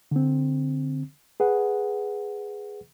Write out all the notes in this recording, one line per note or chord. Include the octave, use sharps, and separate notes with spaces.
D3 C4
G#4 B4 F#5